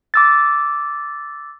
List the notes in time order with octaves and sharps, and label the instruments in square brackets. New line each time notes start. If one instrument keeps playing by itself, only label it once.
[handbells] D6 E6 A6